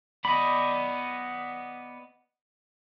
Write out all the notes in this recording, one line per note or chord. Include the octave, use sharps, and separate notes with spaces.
B3 D5 D#5 B5